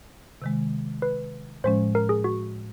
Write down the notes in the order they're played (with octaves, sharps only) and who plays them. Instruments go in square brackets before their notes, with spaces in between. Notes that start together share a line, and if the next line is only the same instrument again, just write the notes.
[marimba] C3 D#3 G#3
[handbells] B4
[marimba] A2 F3 G#3 C#4 [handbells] C5
[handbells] A#4
G#4
F#4